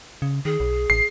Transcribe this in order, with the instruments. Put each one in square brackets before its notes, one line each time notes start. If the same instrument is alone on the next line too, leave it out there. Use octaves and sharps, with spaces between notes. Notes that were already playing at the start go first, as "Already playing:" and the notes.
[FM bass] C#3
[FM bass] D#3 [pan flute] G#4
[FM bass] B1
[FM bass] A1 [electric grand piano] C7